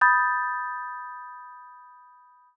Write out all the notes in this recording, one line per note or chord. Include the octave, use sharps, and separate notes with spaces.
B5 D#6 G6 A6